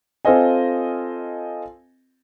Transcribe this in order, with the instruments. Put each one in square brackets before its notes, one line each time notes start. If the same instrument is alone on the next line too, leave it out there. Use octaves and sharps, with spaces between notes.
[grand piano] C4 F4 A4 C5 D#5 G#5